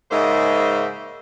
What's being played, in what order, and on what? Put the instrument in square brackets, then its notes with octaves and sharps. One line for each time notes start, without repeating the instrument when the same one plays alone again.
[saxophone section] G#2 C#3 A#3 C5 D#5 E5